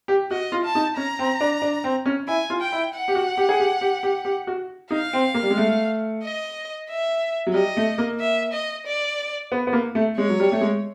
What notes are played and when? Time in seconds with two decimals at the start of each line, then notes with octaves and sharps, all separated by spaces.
0.08 G4
0.31 F#4 D#5
0.52 F4
0.64 A5
0.75 D#4
0.97 C#4 A#5
1.19 C4
1.41 D4
1.62 D4
1.84 C4
2.06 C#4
2.27 E4 G#5
2.50 F4
2.61 G5
2.72 E4
2.94 F#5
3.08 G4
3.15 F#4
3.38 G4
3.49 G#4
3.60 G4
3.81 G4
4.03 G4
4.25 G4
4.47 F#4
4.91 D#4 F5
5.13 C4
5.34 A#3
5.43 G3
5.50 G#3
5.58 A3
6.23 D#5
6.89 E5
7.47 F#3
7.54 G3 D#5
7.77 A3
7.98 A#3
8.20 E5
8.52 D#5
8.86 D5
9.52 B3
9.67 B3
9.73 A#3
9.95 A3
10.17 G#3 C#5
10.29 F#3
10.40 G3
10.52 A3
10.61 G#3